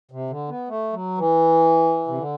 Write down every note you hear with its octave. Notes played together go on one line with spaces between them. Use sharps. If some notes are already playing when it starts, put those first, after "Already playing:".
C3
D3
B3
A3
F#3
E3
C3
D3